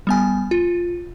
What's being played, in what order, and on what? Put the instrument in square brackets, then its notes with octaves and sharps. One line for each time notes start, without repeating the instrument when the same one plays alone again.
[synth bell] G3 B3 G#5
F4